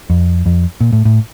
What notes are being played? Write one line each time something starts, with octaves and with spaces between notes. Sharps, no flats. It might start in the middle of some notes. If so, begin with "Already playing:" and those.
F2
F2
A#2
A2
A2